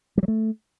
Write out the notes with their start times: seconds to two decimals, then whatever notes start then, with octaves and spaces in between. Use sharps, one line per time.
0.18 G3
0.23 F#3
0.28 A3